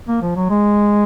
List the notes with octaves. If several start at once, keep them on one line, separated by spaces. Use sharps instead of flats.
A#3
F3
F#3
G#3